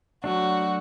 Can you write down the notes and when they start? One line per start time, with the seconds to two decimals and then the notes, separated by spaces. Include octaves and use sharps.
0.24 F#3 A3 D4 F#4